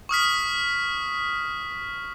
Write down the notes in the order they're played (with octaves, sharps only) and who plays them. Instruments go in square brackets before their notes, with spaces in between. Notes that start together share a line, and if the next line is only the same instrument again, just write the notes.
[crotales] C#6 D#6 F6 B6